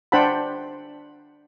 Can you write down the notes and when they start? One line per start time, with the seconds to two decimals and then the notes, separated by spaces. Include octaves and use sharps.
0.12 D4 C5 F#5 G5 A5 B5